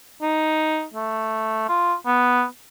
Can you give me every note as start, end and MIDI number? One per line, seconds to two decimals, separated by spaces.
0.22 0.85 63
0.94 1.64 57
1.69 1.94 65
2.06 2.44 59